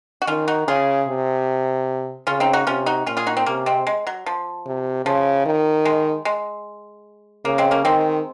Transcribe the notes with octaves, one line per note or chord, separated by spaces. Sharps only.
F#4
D#3 C#4 F4
D#4 F#4
C#3 F4 G#4
C3
C#3 C#4 F4
C4 D#4
D#4 F#4
C3 C#4 F4
D#4 F#4
A#2 C#4 F4
F4 G#4
D#4 F#4
C4 D#4
C3 A#3 C#4
G#3 C4
G#3
F#3
F3
C3
C#3 F3
D#3
G#3
G#3
C#3 A#3
G#3 C4
A#3 C#4
D#3 G#3 C4